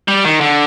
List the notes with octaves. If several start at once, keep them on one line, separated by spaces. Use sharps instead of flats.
G3
D#3
D3